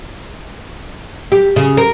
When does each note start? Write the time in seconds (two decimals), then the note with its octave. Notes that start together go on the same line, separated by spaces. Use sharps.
1.32 G4
1.56 C#3
1.77 A#4